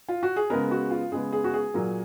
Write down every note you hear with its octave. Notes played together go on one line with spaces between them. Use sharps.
F4
F#4
G#4
C#3 G#3 B3 A#4
F#4
F4
C#3 G#3 B3 G#4
G#4
F#4
G#4
A#2 F#3 A#3